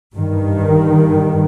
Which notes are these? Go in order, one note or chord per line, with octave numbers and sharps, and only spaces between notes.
G2 D#3